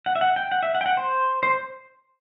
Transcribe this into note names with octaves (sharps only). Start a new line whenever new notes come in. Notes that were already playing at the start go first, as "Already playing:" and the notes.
F#5
E5
F#5
G5
F#5
E5
F#5
G5
F#5
C5
C5